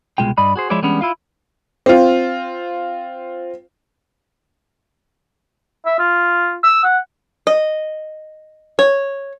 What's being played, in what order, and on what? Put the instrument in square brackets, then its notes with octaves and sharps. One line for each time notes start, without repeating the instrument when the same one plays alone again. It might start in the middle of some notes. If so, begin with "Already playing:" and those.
[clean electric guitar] C2 B2 G#3 F4 G5
G2 D5 D#5 B5
F#4 G#4 C5
F3 G#3 E4 C#5 D5
E3 G3 G#3 B3 C#4 D4
E4 F4 F5
[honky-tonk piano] C4 F4
[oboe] E5
F4
E6
F#5
[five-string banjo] D#5
C#5